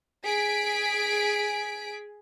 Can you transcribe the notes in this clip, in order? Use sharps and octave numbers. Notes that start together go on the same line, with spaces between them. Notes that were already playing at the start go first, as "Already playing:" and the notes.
G#4 B6 D7